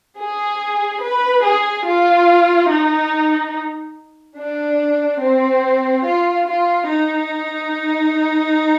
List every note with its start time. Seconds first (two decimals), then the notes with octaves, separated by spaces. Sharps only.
0.18 G#4
1.02 B4
1.44 G#4
1.86 F4
2.70 D#4
4.38 D4
5.21 C4
6.05 F4
6.47 F4
6.89 D#4